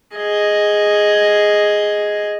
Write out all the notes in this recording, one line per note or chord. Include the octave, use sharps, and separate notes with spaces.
G#4 D#5